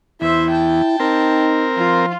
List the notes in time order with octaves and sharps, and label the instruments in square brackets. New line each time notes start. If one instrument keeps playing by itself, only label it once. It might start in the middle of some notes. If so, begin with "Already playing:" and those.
[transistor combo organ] E2 [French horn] E4 [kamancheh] C5 E5
[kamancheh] G5 A5
[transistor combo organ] C4 A#4 [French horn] D#4
[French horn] F3 [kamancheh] F4